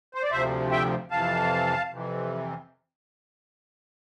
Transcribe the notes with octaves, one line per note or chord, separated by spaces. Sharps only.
C5
D5
D2 C3 F3 C5 E5
E5 G5
F2 C3 E3 F5 A5
F2 C3 E3